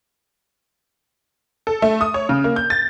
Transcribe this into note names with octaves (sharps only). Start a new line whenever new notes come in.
A4
A3
D#6
C#5
C#3
A#3
G6
A6